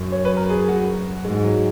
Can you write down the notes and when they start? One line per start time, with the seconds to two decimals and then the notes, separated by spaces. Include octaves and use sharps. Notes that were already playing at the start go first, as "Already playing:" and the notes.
Already playing: F#2
0.12 C#5
0.25 B4
0.37 A#4
0.49 G#4
0.69 F#4
1.25 G#2 G#3
1.44 F#3